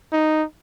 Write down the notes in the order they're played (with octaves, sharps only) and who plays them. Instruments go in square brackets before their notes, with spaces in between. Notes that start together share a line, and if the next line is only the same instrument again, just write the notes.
[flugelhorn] D#4